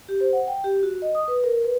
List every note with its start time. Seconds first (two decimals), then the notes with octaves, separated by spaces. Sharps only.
0.09 G4
0.21 C5
0.33 F#5
0.48 G5
0.64 G4
0.83 F#4
1.02 D#5
1.15 D#6
1.28 B4
1.44 A#4
1.65 B4